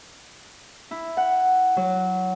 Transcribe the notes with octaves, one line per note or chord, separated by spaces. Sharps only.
E4
F#5
F#3